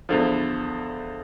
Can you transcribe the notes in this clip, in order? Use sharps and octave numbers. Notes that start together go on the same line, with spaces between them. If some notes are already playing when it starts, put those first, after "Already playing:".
E2 D3 F3